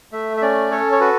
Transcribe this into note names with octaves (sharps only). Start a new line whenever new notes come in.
A3 E5
E5
C#4 D5
A4 C#5
C#5
F#4 B4